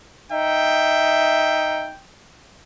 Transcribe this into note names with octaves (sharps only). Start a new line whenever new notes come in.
D#4 E5 G5